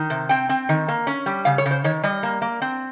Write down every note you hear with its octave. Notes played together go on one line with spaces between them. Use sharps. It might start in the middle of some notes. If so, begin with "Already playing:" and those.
Already playing: D#3
C3
C4 G5
C4
D#3
A#3
C#4
G3
C#3 F5
C#5
C#3
C5
D#3 C#5
G3 D#5
A#3
A#3
C4